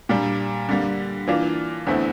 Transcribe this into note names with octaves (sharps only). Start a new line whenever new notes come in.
A#2 G3 D4
D3 G3 A#3
E3 A#3 D4 F4
E2 D3 A3 C4 E4